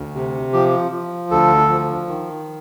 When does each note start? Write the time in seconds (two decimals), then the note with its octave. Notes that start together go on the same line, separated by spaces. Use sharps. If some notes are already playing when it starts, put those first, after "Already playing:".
Already playing: D2
0.15 C3
0.53 F3 G4
0.92 F3
1.31 D2 A4
1.69 F3
2.08 D#3